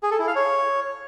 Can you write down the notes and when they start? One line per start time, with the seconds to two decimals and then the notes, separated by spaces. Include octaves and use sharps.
0.03 G#4
0.11 A4
0.19 E4
0.27 F5
0.36 C#5